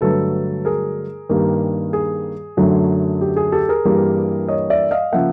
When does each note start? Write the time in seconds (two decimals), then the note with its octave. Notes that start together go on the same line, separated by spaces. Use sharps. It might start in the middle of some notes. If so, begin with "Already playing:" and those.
0.01 G2 D3 F#3 A3 A4 B4
0.65 G#4 A#4
1.29 G2 D#3 G3 A#3
1.93 G#4
2.57 F#2 D3 F#3 A3
3.21 G4
3.37 G#4
3.52 G4 A4
3.69 G#4 A#4
3.85 G2 E3 G3 A#3
4.48 C#5 D#5
4.70 D5 E5
4.91 D#5 F5
5.12 C#3 F3 A#3 E5 F#5